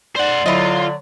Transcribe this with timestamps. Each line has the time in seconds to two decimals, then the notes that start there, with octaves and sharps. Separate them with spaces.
0.16 C5 D5 F#5
0.46 D3 F#3 E4 F4 D#5